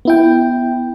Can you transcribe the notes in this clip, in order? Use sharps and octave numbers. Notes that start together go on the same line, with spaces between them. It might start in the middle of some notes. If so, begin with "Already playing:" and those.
B3 E4 G5